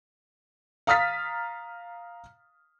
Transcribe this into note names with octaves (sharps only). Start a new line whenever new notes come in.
F5 A#5 D#6 F6 A6 B6